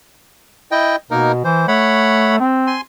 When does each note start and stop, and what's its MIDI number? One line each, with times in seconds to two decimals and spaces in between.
0.71 0.96 64
0.71 0.96 75
0.71 0.96 79
1.11 1.40 47
1.11 1.32 58
1.11 1.32 63
1.11 1.32 70
1.45 1.66 52
1.45 1.67 72
1.68 2.39 57
1.68 2.36 73
1.68 2.36 78
1.68 2.36 83
2.40 2.76 60
2.67 2.81 80
2.67 2.81 84